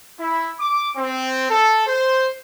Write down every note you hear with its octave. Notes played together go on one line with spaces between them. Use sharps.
E4
D6
C4
A4
C5